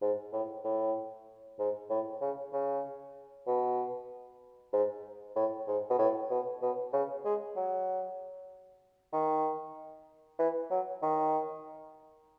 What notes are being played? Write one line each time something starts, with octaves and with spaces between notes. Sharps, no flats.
G#2
A2
A2
G#2
A2
C#3
C#3
B2
G#2
A2
G#2
B2
A2
B2
B2
C#3
G#3
F#3
D#3
E3
F#3
D#3